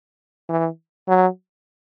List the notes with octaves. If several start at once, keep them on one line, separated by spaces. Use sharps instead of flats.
E3
F#3